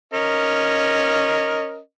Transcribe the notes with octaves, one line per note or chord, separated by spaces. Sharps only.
C#4 A#4 D#5